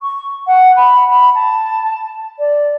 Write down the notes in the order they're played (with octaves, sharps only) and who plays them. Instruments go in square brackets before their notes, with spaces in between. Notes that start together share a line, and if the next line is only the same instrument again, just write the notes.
[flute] C#6
F#5
B5
B5
A5
D5